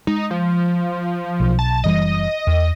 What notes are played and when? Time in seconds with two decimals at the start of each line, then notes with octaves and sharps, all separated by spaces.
0.07 G#3 D#4
0.31 F3
1.40 B1
1.59 A5
1.84 F#1 E3 G3 D#5
2.47 E2